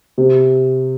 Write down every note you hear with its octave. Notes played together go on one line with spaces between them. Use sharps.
C3